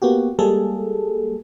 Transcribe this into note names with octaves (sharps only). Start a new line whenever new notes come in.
A#3 B3 F#4 G4
G3 G#3 A#3 G#4 A4